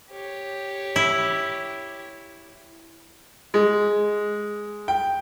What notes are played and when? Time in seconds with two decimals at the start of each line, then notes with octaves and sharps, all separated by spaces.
0.10 G4 C#5
0.96 E4
3.54 G#3
4.88 G5